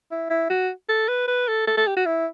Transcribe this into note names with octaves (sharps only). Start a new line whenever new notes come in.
E4
E4
F#4
A4
B4
B4
A4
A4
A4
G4
F#4
E4